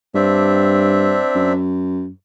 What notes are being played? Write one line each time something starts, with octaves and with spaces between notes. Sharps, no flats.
G2 C4 D4 E5
F#2